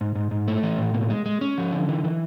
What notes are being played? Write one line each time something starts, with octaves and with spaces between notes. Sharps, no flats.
G#2
G#2
G#2
A3
E3
A2
B2
G#3
G#3
C#4
F3
D3
E3
E3